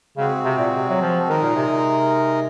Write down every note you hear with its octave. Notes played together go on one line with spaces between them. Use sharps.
C#3 G#3 C4 F#4
C3
A#2
C3
F#3
F3
D#3 G#3 D#4 A#4
A#2
C3
C3